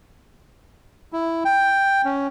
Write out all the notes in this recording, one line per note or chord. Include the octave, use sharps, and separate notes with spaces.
E4
G5
C#4